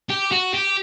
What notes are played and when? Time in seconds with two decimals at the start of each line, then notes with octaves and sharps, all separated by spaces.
0.10 G4
0.32 F#4
0.54 G4